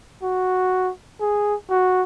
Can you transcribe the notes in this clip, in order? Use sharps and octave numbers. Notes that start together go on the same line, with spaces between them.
F#4
G#4
F#4